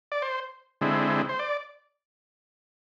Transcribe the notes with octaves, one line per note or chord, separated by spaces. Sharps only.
D5
C5
D3 G#3 C4 E4
C5
D5